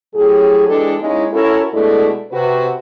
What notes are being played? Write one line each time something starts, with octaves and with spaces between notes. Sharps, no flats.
A2 F#3 G4 G#4
E3 G#3 D4 G4 A4
G#3 A#3 C#4 D#4 E4
C#4 E4 F#4 A4 A#4
B2 G#3 A3 D4 E4 A4
C3 F#4 B4